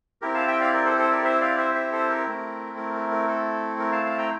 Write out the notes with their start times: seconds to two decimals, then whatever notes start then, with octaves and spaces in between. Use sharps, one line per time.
0.22 C4 E4 G4 A#4
0.34 F5 A5
0.47 E5 G5
0.61 D5 F5
0.73 A#4 D5
0.85 A4 C5
0.99 A4 C5
1.11 A#4 D5
1.24 C5 E5
1.41 D5 F5
1.58 C5 E5
1.75 C5 E5
1.92 A4 C5
2.10 A#4
2.26 A3 C4 E4
2.77 A#4
2.94 A#4
3.11 A#4
3.28 A4
3.79 A#4
3.92 F5 A5
4.06 F5 A5
4.18 G5 A#5